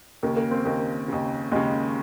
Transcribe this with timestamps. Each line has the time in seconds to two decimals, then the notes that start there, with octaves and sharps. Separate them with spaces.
0.23 D#2 C#3 A#3
0.37 A#3
0.51 C4
0.65 D#2 C#3 A#3
1.08 D#2 C#3
1.51 D#2 C#3 G#3